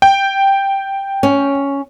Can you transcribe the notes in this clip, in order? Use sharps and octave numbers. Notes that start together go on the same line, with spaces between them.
G5
C#4